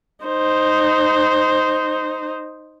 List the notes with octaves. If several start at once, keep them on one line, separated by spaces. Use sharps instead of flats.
D#4 C5